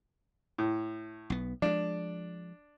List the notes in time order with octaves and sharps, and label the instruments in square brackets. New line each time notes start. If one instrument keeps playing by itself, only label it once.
[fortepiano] A2
[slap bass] B1 B3
[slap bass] F3 G#3 [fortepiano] D4